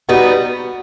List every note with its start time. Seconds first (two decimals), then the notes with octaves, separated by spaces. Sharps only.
0.09 G3 B3 D#4 F#4